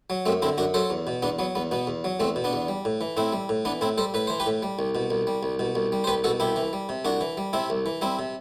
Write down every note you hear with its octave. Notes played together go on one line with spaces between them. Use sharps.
F#3
F#2 A3 C4
D3 C4 E4
F#2 D4 F#4
F#3 A4 C5
E2
B2
E2 B3 D4
F#3 B3
E2 B3
B2 B3
E2
F#3
E2 A3 C4
B2
B3 D4
E2
G3
A2
E3
A2 C4 E4
G3
A2
E3 B3 D4
A2 C4 E4
G3 A4 C5
A2 B4
E3 C5
G4 B4
A2
G3
C2
B2
C2
G3
C2
B2
C2
G3
C5
C2 G4 B4
B2 F#4 A4
C2 E4 G4
E3
G3
C3
C2 D4 F#4
E3
G3
C3 C4 E4
C2
E3
G3 C4 E4
C3